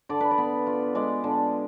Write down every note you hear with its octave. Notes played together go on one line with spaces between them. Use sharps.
D3 D5
B4
D5
B3
F4
G#3 D5
D3